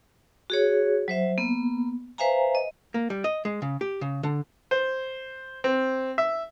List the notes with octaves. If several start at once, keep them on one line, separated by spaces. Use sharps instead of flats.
F#4 G#4 C#5
F#3 C5 E5
A#3 B3
B4 C5 E5 F5 G#5 A#5
D#5
A#3
G3
D#5
G#3
C#3
G4
C#3
D3
C5
C4
E5